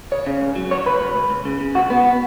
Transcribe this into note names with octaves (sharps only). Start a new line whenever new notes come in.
C#3 C#5
C#3
C#2
F#3
C#2 C#5
C#2 B4
C#2
C#2
C#2
C#3
C#3
C#2 F#4
C#2 B3